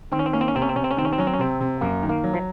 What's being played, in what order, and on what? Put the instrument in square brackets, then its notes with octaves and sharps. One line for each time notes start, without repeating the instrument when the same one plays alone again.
[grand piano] D#3 [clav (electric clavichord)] C4
[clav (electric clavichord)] C#4
C4
[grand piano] A#3 [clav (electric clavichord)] C#4
[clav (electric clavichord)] C4
C#4
[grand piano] C3 [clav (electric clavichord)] C4
[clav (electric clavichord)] C#4
C4
[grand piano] C3 [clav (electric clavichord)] C#4
[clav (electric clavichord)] C4
C#4
[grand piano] D#3 [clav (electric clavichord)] C4
[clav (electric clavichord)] C#4
C4
[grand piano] F#3 [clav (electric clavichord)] C#4
[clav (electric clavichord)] C4
C#4
[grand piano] C3 [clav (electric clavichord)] C4
[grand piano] C3
[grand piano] F#2 [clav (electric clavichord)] A#3
[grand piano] D#3
[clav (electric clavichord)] A#3
[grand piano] F#3
[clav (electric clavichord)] F3